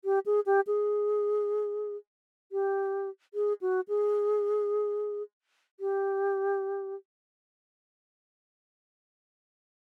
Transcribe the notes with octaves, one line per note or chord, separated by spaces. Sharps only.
G4
G#4
G4
G#4
G4
G#4
F#4
G#4
G4